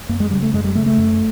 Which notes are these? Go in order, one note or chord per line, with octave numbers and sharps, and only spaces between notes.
F#2 A#3
G#3
C#3 G3
A3
F#2 G#3
G3
C#3 A3
A3
F#2